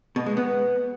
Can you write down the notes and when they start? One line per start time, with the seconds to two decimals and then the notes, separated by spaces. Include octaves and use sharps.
0.16 B2
0.26 G#3
0.37 B3